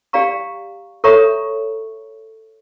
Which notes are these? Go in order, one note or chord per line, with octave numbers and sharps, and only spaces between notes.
G4 D5 F5 A#5 C#6
A4 C#5 E5 A#5 C#6